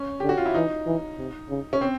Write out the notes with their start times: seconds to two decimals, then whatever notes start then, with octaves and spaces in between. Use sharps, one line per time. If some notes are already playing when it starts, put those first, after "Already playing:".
Already playing: C#4
0.20 D3 G4
0.29 F#4
0.38 F4
0.46 E4
0.54 E3 D#4
0.86 E3
1.18 C3
1.49 C#3
1.73 C#4
1.81 C4